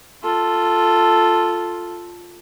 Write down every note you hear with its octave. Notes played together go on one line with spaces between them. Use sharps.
F4 A4